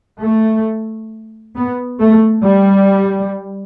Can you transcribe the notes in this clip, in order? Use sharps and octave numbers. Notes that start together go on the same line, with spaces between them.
A3
B3
A3
G3